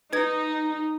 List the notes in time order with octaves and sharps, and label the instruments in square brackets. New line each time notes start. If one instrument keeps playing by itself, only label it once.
[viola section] D#4 [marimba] B4 G#6